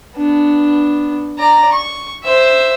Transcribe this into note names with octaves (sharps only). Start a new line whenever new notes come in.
B3 D4
D5 A#5
C#6
C5 E5